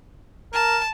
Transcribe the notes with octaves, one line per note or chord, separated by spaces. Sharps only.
A#4 A5